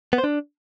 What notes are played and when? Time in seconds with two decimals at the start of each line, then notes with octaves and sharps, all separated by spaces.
0.13 B3
0.18 C5
0.24 D4